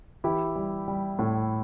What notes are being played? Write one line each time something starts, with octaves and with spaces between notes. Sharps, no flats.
E3 E4 G4
G3
G3
A2